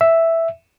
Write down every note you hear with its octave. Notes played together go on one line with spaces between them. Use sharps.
E5